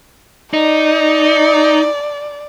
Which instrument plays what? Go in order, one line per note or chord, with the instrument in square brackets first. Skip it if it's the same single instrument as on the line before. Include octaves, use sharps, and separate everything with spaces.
[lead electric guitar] D#4 [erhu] D5